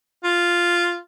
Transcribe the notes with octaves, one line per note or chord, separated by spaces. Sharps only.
F4